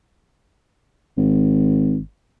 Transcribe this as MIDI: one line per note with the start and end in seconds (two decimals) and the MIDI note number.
1.17 2.00 32